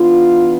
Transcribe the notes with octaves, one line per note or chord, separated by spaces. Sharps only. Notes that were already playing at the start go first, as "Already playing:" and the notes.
Already playing: E3 B3 D4 F4